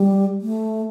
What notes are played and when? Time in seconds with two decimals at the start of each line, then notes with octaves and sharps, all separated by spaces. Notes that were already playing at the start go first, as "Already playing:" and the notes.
Already playing: G3
0.42 A3